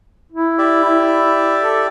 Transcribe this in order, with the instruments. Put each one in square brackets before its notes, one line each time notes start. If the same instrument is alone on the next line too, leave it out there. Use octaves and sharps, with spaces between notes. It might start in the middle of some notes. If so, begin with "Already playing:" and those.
[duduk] E4
[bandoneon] G4 D5 E5
[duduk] E4
A4